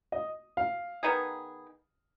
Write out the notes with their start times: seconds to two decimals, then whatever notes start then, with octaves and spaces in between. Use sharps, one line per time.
0.12 D#5
0.57 F5
1.03 D#3 B3 D#4 G#4